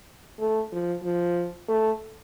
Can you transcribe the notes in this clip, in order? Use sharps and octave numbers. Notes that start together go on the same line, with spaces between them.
A3
F3
F3
A3